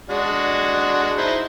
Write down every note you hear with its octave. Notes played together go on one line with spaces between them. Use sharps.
G#3 D4 F#4
D#4 E4 C5